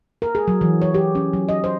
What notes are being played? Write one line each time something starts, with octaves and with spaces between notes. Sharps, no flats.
A#4
G#4
F#3
E3
C#5
G4
C#4
F#3
D#5
C5